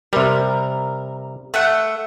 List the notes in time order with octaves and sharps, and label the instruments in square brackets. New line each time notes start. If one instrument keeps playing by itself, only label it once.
[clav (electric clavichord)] C3 G3 [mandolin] A#4
[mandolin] A3 E5 F#5